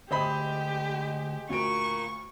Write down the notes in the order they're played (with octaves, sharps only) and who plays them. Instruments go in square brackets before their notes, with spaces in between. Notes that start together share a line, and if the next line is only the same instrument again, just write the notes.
[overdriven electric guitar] D2 [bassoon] G#3 [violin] G4 [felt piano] C5 D#5 B5
[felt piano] D2 D7 [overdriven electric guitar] F4 A#4 [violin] C#6